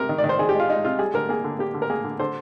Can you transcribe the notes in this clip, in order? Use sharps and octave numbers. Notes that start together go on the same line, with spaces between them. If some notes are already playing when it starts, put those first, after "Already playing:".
Already playing: C3 A#4
D#3
D5
D#3
C5
D#3 G#4
G4
G#3
F4
G#3 D#4
C3 F4
G3 G#4
D3 A#4
A#3 G#4
D3
A#3 G4
D3
A#4
A#3 G#4
D3
D3 C5